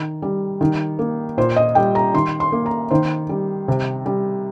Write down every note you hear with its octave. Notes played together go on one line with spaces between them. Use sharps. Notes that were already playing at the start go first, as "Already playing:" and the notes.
Already playing: D#3
G3
D#3
A#3
A#2 C5
D#5
G3 G5
A#5
D#3 C6
C6
A#3
A#5
D#3 C5
G3
C3
G3